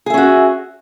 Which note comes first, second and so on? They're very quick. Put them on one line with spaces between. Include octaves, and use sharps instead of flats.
G#4 E5 C#4 F#4